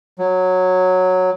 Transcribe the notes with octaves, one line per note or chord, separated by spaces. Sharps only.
F#3